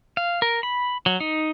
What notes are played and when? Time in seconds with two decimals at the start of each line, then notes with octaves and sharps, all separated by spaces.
0.17 F5
0.42 A#4
0.63 B5
1.06 F#3
1.20 D#4